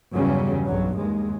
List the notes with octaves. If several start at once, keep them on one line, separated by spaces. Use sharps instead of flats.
G1 E2 C#3 F#3 G3 C#4
B1 G2 F#3
D#2 G#3